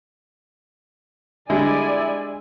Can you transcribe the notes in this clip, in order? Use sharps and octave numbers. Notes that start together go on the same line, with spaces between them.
D3 G3 G#3 E4 D5 G#5